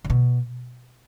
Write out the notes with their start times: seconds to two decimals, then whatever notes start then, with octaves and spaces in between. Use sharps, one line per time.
0.04 D3
0.10 B2